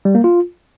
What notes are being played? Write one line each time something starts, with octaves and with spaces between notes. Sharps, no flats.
G3
A#3
F4